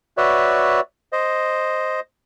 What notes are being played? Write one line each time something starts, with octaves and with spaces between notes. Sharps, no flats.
F#4 B4 C#5 D5 E5
C5 D#5